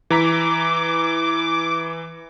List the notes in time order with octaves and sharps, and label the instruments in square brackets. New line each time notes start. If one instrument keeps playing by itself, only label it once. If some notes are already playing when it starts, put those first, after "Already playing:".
[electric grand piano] E3 A#5 B6 [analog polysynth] D6